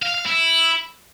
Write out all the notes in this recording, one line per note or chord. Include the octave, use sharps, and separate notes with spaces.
F5
F5
E4